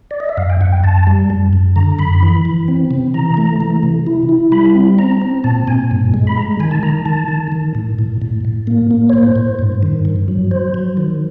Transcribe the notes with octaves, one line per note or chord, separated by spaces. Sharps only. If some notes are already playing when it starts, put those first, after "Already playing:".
D5
D#5
E5
F#2 F5
G5
F#2 F#5
G5
F#2 A5
G3
F#2
F#2
D3 A#5
F#2 B5
E3
E3
C4
C3
E3 A#5
A3
E3
C3
E4
E4
G3 B5
C4
C4 A#5
C4
A#2 A5
A#2 G#5
G2
G#3
B5
G#3 A#5
D#3 G#5
A5
D#3 A#5
D#3 A5
D#3
D#3
A2
A2
A2
A2
A#3
A#3
C#5
A2 C5
A2
G2
D#3
G2
F#3
F#3 C5
F#3
D#3